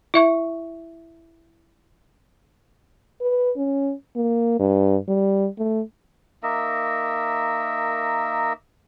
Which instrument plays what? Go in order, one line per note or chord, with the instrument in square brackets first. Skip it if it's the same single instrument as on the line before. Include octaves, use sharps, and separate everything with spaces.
[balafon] E4 E5 C#6
[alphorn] B4
C#4
A#3
G2
G3
A3
[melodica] A#3 D#4 A#4 E5